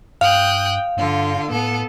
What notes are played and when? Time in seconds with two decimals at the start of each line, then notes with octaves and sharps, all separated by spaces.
0.21 G2 F5 G5 D#6 F#6
0.97 G2 D3 F4
1.51 A2 B3 A4